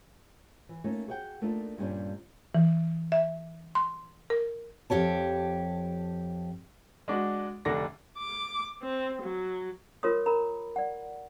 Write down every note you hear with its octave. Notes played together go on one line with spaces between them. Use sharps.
E3
A3 A#3 C#4 D#4 F4
F#4 G#4 C5 E5 F#5 G5
A3 A#3 D4 D#4 F4
G2 A#2 G3 A3 C#4 D4
E3
E5
C6
A#4
F2 G4 C#5 A5
G#3 D4 F#4
F1 D3 D4 A#6
D6
C4
F#3
F4 A#4 C#5 C6 D#6
A#4 A#5 B5
D5 F#5